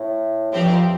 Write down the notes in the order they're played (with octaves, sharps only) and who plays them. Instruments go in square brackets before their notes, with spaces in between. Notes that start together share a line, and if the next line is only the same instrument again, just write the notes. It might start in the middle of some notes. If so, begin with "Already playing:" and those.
Already playing: [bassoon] A2
[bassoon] A2 [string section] F3 C4 G4
[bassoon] G2
F2